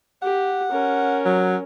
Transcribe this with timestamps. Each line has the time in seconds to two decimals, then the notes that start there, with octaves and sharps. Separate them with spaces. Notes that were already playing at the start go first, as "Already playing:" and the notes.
0.22 G4 F#5
0.70 C#4 A#4
1.25 F#3